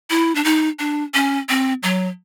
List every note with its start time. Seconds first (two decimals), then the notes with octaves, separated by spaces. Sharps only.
0.10 E4
0.35 D4
0.44 D#4
0.79 D4
1.14 C#4
1.49 C4
1.83 F#3